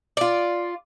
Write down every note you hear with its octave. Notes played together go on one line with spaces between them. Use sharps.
F4 D5